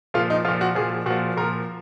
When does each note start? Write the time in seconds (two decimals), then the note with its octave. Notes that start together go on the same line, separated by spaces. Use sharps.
0.14 A#2 F3 F4
0.30 D#4
0.44 F3 F4
0.49 A#2
0.61 F#4
0.75 A#2 F3 G#4
1.06 A#2 F3 F#4
1.37 A#2 F3 A#4